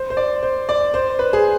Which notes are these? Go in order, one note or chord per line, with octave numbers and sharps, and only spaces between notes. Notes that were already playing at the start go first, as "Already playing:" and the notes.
Already playing: C5
C5
D5
C5
D5
C5
B4
G#4